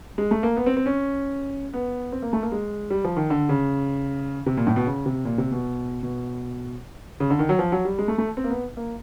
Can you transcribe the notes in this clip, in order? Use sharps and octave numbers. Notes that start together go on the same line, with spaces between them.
G#3
A3
A#3
B3
C4
C4
C#4
B3
C4
A#3
A3
A#3
G#3
G3
F3
D#3
D3
C#3
C3
A#2
A2
B2
C#3
C3
A#2
C3
B2
B2
C#3
D3
D#3
F#3
F3
F#3
G3
G#3
A3
A3
C4
A#3
B3
A#3